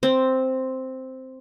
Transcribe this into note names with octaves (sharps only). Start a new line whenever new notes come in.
C4